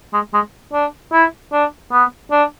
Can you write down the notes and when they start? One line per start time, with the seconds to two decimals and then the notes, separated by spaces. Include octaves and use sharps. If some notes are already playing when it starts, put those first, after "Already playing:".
0.13 G#3
0.34 G#3
0.73 D4
1.12 E4
1.52 D4
1.92 B3
2.31 D4